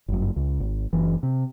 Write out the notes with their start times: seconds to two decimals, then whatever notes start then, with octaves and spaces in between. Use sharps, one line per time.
0.08 G1 F#2
0.36 C#2
0.60 G#1
0.93 F#1 E3
1.23 C3